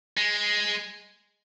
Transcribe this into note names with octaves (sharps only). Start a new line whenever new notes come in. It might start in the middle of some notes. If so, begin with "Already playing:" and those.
G#3